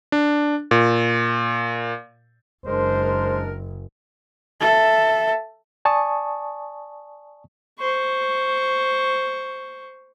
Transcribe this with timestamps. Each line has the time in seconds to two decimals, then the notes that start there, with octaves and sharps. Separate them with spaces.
0.12 D4
0.71 A#2
2.66 F#1 G#3 D4 A#4 C5
4.60 A4 E5
5.85 D5 G#5 A5 C#6 D#6
7.79 C5 C#6